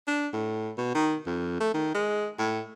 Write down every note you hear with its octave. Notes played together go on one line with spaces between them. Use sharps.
D4
A2
B2
D#3
F2
A3
D#3
G#3
A2